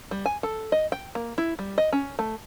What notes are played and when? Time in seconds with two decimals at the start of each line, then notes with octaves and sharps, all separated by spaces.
0.11 G3
0.26 G#5
0.43 A4
0.72 D#5
0.92 G5
1.15 A#3
1.38 E4
1.59 G3
1.78 D#5
1.93 C#4
2.19 A3